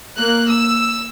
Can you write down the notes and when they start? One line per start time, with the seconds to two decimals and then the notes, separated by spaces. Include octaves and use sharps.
0.18 A#3 F#6
0.49 E6